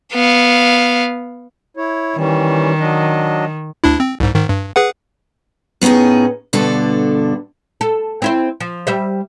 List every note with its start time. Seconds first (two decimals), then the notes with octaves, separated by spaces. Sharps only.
0.14 B3 F5
1.77 E4 C#5
2.17 D#3 E3 G3 C#4
2.80 F#3 D4 D#5
3.84 D2 D4 E4
4.00 C4
4.20 C2 G#2
4.34 G#2 D#3
4.49 G2
4.76 G#4 B4 F#5
5.81 A2 B3 C#4 D#4 G#4
6.53 G2 B2 D3 D4 A4
7.81 A4
8.22 C4 E4 C5
8.60 F3
8.87 G3 C5 E5